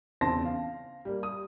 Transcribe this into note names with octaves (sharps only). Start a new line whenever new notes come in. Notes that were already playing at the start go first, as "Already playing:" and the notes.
E2 C#3 C4 A5 C6 A#6
F5
G3 A#3
D#6